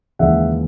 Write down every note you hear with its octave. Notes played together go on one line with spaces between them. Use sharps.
D#2 C#3 E3 G#3 E5 F#5